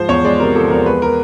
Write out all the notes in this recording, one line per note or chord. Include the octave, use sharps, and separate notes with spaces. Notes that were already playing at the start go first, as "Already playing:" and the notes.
Already playing: G#2 F3 C5
E2 C#5
G#3 D5
C3 A#4
F3 A4
E2 A#4
G#3 B4
A#4